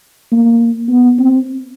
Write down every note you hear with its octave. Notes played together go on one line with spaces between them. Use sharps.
A#3
B3
C4